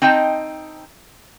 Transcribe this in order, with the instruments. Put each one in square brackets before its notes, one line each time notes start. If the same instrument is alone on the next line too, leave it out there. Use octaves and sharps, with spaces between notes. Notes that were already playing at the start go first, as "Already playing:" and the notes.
[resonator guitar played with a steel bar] C4 D#4 D#5 G5 A5